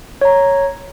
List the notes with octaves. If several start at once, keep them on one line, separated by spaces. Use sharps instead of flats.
C#5 A#5